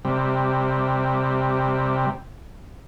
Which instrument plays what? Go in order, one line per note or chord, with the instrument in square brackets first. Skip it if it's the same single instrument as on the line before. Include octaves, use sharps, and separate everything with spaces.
[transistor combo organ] C3 G3